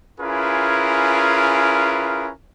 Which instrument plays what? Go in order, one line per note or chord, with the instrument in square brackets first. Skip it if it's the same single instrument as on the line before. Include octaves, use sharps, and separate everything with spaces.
[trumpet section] C#4 E4 F4 G#4 A#4 B4